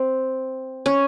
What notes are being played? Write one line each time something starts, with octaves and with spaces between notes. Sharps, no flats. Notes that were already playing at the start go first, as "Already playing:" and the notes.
Already playing: C4
C#4